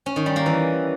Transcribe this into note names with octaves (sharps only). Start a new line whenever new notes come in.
C#4
D#3
G3
A#3
E3